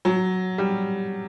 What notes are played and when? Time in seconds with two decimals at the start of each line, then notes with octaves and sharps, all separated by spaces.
0.05 F#3
0.58 G3